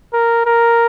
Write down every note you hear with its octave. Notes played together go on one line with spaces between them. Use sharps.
A#4
A#4